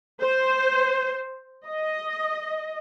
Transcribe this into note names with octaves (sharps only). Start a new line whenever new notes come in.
C5
D#5